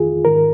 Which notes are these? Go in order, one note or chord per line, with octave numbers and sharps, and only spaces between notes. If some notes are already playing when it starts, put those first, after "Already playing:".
Already playing: F2 D#3 F4 G#4
G#2 D#3 A#4